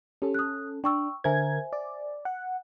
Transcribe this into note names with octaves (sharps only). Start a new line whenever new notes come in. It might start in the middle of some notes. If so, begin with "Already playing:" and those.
C#4 G4 A4
D#6 F#6
D4 G5 C#6 E6
D3 A#4 C5 E5 G#5 G#6
D5
F#5